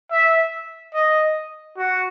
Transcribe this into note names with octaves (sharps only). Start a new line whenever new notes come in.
E5
D#5
F#4